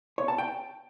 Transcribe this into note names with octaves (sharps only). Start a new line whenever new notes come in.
C#5
A5
G5